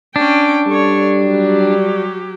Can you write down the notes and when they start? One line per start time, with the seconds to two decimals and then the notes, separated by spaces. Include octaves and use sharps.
0.16 C#4 D4 G5
0.67 G3 A4 C#5
1.24 F#3 G4